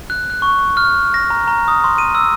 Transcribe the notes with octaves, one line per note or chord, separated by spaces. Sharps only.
F#6
F#6
C#6
F6
A#6
A#5
A#5
D#6
C6
D#7
E6